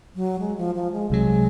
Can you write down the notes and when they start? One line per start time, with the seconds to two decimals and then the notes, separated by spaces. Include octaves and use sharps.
0.15 F#3
0.39 G#3
0.57 F3
0.75 F3
0.92 G#3
1.10 C2 C3 F#3 G#3